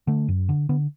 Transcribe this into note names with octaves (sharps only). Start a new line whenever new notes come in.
D3 A3
F#2
D3
D3 B3